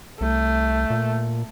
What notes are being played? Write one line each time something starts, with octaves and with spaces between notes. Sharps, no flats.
C2 A3
A#2